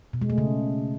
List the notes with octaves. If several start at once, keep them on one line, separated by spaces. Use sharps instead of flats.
B2
G#3
A3
C#3